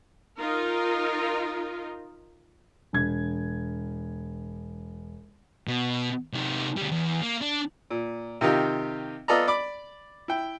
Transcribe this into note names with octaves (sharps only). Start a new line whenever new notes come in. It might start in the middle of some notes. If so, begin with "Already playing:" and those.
D#4 F4 A#4
E1 G#6
B2
C3 D#4
D2 G3
E2
A#3
D4
A#2
C3 D#3 D#4 F4 G4
B3 F4 A4 D5 D#5 A#5
D5 B5 D6
E4 G5